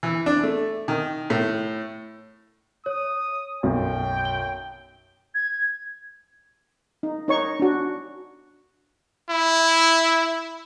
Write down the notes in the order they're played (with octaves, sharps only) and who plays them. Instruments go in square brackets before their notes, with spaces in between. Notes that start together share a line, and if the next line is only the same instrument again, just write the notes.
[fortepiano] E3
D4
A3
D#3
A2
[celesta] C#5 [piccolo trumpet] D#6
[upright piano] B1 F#2 [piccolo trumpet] G5
[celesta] G7
[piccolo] G#6
[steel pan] D#4
D#4 C#5 C#6
D4 F#4
[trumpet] E4